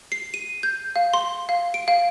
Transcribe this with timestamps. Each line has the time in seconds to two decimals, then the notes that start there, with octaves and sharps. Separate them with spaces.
0.12 C7
0.34 D#7
0.63 G6
0.96 F5
1.14 C6
1.49 F5
1.74 D7
1.88 F5